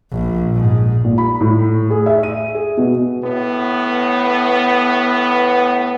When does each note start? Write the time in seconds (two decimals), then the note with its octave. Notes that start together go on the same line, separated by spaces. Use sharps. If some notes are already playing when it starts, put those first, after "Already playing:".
0.12 A#1
0.55 G#2
1.04 A#2
1.18 B5
1.41 A2
1.90 G#4
2.06 E5
2.23 D#7
2.55 G#4
2.77 B2
3.24 A2 B3